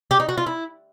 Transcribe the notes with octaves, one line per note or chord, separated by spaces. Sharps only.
G4
D#4
F#4
F4
E4